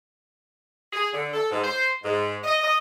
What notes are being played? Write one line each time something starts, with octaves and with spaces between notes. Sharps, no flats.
G#4
D3
A4
G#2
C5
G#2
D#5
D#5